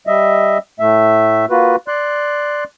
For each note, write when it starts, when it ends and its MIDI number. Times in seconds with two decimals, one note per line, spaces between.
0.07 0.58 55
0.07 0.58 75
0.07 0.58 76
0.80 1.46 45
0.80 1.46 57
0.80 1.46 76
1.50 1.76 58
1.50 1.76 65
1.50 1.76 66
1.50 1.76 71
1.88 2.64 74
1.88 2.64 84
1.88 2.64 90